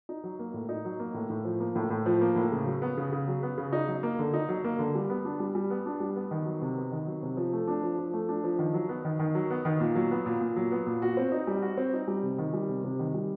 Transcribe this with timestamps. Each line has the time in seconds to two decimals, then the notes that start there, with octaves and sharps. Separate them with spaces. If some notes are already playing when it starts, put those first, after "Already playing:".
0.09 D#4
0.24 F#3
0.39 A#3
0.54 A2
0.69 D#4
0.85 F#3
0.99 A#3
1.14 A2
1.30 A2
1.45 F3
1.60 A#3
1.76 A2
1.90 A2
2.06 F3
2.21 A#3
2.36 A2
2.52 C#3
2.66 F#3
2.82 B3
2.97 C#3
3.12 C#3
3.28 F#3
3.43 B3
3.58 C#3
3.73 D#4
3.88 F#3
4.03 A#3
4.19 D3
4.33 D#4
4.49 F#3
4.64 A#3
4.79 D3
4.95 G3
5.09 B3
5.25 D4
5.40 G3
5.55 G3
5.70 B3
5.86 D4
6.00 G3
6.16 B3
6.31 D#3
6.46 F#3
6.62 C3
6.77 B3
6.92 D#3
7.07 F#3
7.23 C3
7.37 F3
7.53 A3
7.68 D4
7.83 F3
7.99 F3
8.13 A3
8.29 D4
8.44 F3
8.59 D#3
8.74 F#3
8.89 B3
9.05 D#3
9.19 D#3
9.35 F#3
9.51 B3
9.65 D#3
9.80 A#2
9.95 F#3
10.11 B3
10.26 A#2
10.41 A#2
10.56 F#3
10.71 B3
10.87 A#2
11.02 F#4
11.17 C4
11.32 D#4
11.47 G3
11.62 F#4
11.77 C4
11.93 D#4
12.08 G3
12.23 C3
12.38 D#3
12.53 G3
12.69 C3
12.84 C3
12.99 D#3
13.14 G3